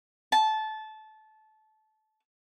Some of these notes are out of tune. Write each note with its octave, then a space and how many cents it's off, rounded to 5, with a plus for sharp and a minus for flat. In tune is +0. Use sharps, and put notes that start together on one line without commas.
A5 -20